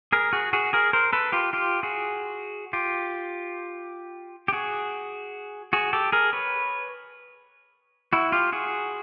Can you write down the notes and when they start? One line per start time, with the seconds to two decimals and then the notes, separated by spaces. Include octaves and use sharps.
0.13 G#4 A#4
0.33 F#4 G#4
0.53 F#4 G#4
0.73 G#4 A#4
0.93 A#4 C5
1.13 A4 B4
1.32 F4 G4
1.53 F4 G4
1.83 F#4 G#4
2.73 F4 G4
4.48 G4
4.53 F#4 G#4
5.73 F#4 G#4
5.93 G4 A4
6.12 G#4 A#4
6.33 B4 C#5
8.13 E4 F#4
8.32 F4 G4
8.52 F#4 G#4